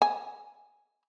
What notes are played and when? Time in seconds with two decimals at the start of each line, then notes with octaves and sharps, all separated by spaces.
0.02 G#5